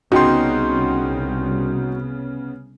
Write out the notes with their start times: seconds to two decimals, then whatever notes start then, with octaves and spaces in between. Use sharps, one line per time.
0.12 C2 C#3 B3 D#4 F#4 G5 C6